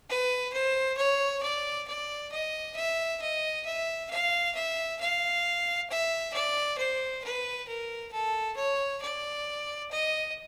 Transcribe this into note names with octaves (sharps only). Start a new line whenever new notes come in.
B4
C5
C#5
D5
D5
D#5
E5
D#5
E5
F5
E5
F5
E5
D5
C5
B4
A#4
A4
C#5
D5
D#5